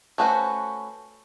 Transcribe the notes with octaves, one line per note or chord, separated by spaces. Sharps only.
A3 C#4 F#4 B4 C5